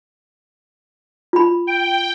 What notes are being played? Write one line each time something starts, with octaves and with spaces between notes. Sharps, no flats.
F4 B5
G5